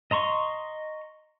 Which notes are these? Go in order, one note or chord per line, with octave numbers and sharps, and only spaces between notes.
D#5 A#5 C6 C#6